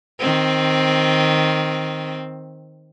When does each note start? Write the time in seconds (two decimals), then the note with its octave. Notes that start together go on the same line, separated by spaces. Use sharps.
0.19 D#3 C4